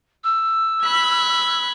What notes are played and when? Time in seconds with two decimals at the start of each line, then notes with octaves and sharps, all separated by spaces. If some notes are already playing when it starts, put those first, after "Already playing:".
0.24 E6
0.84 B5 F#6 G#6